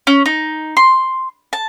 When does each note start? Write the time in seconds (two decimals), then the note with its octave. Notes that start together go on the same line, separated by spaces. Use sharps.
0.07 C#4
0.26 D#4
0.77 C6
1.53 A5